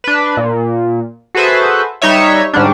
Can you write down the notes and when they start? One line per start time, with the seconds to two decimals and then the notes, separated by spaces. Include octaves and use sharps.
0.04 D4 B4
0.37 A#2
1.35 F#4 G#4 A4 B4 C5 E5
2.02 G3 D#4 B4 C#5 E5
2.53 G#2 D3 G3 C#4 D4